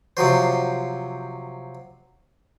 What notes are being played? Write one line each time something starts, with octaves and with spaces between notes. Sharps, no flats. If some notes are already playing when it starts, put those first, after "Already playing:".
C3 F3 F#3 C5